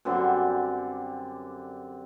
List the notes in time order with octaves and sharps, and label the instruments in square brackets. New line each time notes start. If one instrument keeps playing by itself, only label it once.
[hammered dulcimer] F#2 D3 G3 C4